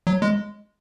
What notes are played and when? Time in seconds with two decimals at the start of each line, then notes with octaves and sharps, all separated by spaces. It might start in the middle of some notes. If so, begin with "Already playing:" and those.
0.07 F#3
0.22 G#3